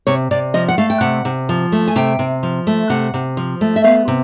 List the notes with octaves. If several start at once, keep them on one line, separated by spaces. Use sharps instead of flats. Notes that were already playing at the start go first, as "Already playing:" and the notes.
C3 C#5
C3 D5
F3 D#5
F#5
A3 F5
G5
C3 F#5
C3
F3
A3
G#5
C3 G5
C3
F3
A3
C3 F#5
C3
F3
A3
E5
B3 F5
C3